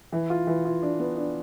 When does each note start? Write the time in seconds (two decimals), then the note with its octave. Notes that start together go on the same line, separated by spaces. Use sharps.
0.12 E3
0.30 F4
0.47 E3
0.65 F4
0.82 D4
0.99 B3
1.17 D4